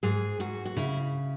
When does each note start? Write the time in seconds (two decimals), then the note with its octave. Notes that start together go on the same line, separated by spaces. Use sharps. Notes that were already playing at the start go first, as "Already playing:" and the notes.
0.03 G#2 G#4
0.40 G#2 F#4
0.65 F#4
0.76 C#3 E4